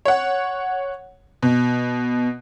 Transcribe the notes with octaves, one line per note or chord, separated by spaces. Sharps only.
C#5 F#5
B2